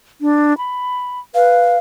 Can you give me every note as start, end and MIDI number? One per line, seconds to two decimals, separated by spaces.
0.21 0.57 62
0.58 1.20 83
1.35 1.76 71
1.35 1.79 77